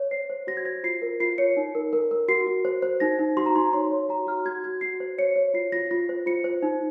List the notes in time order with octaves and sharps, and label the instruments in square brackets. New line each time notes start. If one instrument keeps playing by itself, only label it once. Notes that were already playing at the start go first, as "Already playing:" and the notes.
Already playing: [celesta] C#5
C5 C7
C5
F#4 A#6
G#6
C5 A#6
F4 C7
A#4
F4 C7
C#5 C#7
D#4
A#4
A#4
A#4
F#4 C7
F#4
C5
C5
D#4 A#6
D#4
F#4 C6
A#5
D#4 C6
C#5 C6
C#5
F#4 A#5
F#4 F6
F#4 G#6
F#4 G#6
F#4 C7
C5
C#5 C#7
C#5
F4 C7
F4 A#6
F4 A#6
C5
F4 C#7
C5
D#4